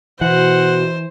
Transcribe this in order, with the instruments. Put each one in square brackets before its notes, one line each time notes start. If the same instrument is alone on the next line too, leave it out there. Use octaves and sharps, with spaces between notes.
[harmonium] B2 [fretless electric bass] E3 [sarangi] C5 [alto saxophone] F#5